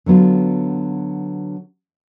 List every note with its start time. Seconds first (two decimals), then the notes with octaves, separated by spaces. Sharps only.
0.06 D3 F#3 B3 F4